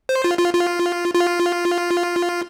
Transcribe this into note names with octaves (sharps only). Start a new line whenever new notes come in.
C5
F4
F4
F4
F4